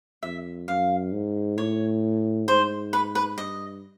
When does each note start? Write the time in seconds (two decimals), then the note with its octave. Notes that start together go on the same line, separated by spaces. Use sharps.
0.23 F2 E5
0.68 F#2 F5
1.13 G#2
1.57 A2 C#5
2.48 G#2 C5
2.93 B4
3.15 B4
3.38 G2 D#5